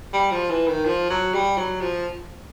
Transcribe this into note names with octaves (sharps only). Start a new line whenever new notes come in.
G3
F3
E3
D#3
F3
F#3
G3
F#3
F3